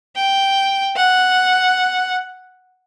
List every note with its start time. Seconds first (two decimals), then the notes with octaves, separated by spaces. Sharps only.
0.15 G5
0.96 F#5